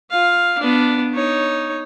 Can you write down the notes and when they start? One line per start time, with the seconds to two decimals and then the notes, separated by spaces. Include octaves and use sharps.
0.10 F4 F5
0.59 B3 D4
1.13 D#4 C#5